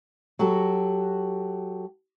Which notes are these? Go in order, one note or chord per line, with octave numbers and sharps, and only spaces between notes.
F#3 F#4 G4 A4